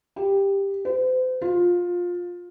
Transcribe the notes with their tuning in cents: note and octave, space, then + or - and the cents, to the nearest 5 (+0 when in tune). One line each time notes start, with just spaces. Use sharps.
G4 +10
C5 -40
F4 +15